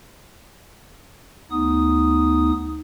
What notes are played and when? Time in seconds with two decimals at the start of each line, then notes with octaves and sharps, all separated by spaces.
1.51 D2 B3 D#4 D#6